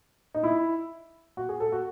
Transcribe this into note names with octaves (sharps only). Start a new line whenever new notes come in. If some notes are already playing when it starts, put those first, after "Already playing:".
D#4
E4
F#4
G#4
A4
F#4